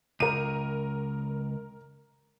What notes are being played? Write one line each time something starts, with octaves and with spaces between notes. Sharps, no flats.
C#2 A#4 D#7